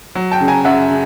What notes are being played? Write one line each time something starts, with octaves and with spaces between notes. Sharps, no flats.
F#3
G5 A5
C#3
G#5 A#5
F#2 E5 F#5
C#3